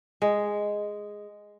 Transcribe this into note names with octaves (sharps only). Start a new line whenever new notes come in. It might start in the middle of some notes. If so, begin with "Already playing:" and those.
G#3